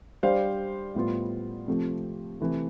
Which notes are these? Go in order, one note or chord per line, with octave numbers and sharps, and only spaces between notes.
G3 D4 G4 C5 F5
A2 G3 B3 F4
C3 F3 A3 C4 G4
C3 E3 A3